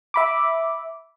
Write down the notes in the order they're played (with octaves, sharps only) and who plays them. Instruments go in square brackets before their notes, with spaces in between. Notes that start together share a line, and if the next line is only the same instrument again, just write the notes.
[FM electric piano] E5 B5 D6